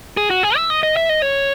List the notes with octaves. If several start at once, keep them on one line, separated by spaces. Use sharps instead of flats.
G#4
F#4
G#4
E5
D#5
D#5
E5
D#5
C#5